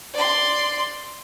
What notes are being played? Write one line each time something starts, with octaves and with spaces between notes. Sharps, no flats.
D5 C6